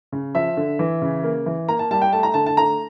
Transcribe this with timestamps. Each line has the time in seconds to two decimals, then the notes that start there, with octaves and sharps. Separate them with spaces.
0.12 C#3
0.35 F3 E5
0.57 D3
0.79 E3
1.02 C#3
1.24 A#3
1.46 E3
1.68 A#3 A#5
1.79 A5
1.91 G3 A5
2.01 G5
2.13 A3 A5
2.23 A#5
2.34 D3 A5
2.46 A5
2.57 A3 A#5